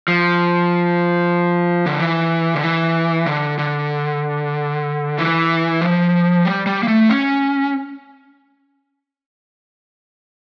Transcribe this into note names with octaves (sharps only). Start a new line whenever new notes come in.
F3
D3
E3
D3
E3
D3
D3
E3
F3
G3
G3
A#3
A3
C#4